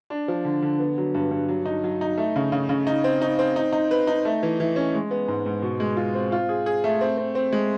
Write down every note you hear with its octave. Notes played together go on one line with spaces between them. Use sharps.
D4
F3
D3
D3
B3
F#3
G2
G2
F#3
D#4
F#3
D#4
A3
C#3
C#3
C#3
D#4
C4
D#4
C4
D#4
D#4
B4
D#4
A3
E3
E3
C#4
G#3
B3
G#2
G#2
B2
G#3
F4
C4
F4
G#4
G#4
A3
C4
C4
C4
G#3